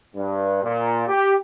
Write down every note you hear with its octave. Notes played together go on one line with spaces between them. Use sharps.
G2
A#2
G4